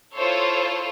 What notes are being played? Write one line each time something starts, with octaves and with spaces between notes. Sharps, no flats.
E4 F4 A4 C5 C#5